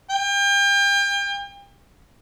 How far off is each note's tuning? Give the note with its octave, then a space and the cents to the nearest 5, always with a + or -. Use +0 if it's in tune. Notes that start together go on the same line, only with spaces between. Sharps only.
G5 +35